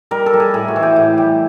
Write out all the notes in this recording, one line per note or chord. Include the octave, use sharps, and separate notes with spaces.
G3 A#4
A4
G3
G#4
A2 G#4
F#4
E3
G4
A2
G3